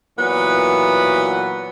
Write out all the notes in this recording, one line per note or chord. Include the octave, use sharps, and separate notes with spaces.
A#2 E3 F#3 B3